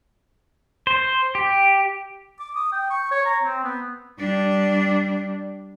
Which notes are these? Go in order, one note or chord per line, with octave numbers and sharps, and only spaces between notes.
C5
G4
D6
D#6
G5
C#6
C#5
A#5
C4
B3
G3 D4